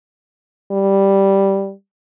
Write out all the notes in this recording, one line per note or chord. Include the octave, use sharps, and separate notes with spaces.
G3